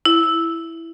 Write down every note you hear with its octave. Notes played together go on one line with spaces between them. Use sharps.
E4